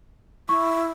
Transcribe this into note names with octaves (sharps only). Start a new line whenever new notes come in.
E4 C#6